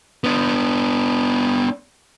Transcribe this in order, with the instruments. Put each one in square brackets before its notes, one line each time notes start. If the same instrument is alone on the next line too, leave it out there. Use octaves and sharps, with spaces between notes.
[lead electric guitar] B3 D4